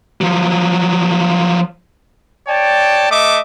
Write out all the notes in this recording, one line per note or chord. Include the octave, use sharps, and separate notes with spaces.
F3 F#3
C#5 D5 G5 A5
A3 D#5 E5 D6